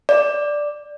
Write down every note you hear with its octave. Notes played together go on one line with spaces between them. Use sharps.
D5